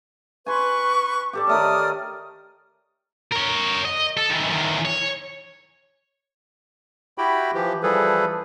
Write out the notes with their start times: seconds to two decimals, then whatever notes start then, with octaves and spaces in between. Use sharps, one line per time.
0.46 B4 G#5 C6 C#6
1.33 G4 A4 D5
1.47 D#3 A3 C#5 D5 D#6 F6
3.32 A#4 C#5
3.85 D#5
4.17 A4
4.30 D#3 E3
4.50 E2 D#3
4.85 C#5
7.18 E4 F#4 G4 G5 B5
7.54 E3 F3 G4
7.83 E3 F3 G3 G#4 A4 B4